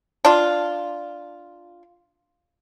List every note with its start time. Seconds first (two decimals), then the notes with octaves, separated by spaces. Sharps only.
0.25 D4 F4